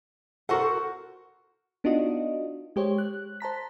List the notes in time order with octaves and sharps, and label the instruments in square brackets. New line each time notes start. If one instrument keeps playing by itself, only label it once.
[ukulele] F#4 C5 F#5 [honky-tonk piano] A4 A#4
[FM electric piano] B3 D4 D#4 F4 F#4 D#5
G#3 G4 C5 C#5
F#6
C5 A5 A#5 B6